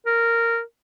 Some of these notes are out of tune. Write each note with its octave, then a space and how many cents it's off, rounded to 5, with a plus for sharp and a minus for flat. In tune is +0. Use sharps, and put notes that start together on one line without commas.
A#4 -10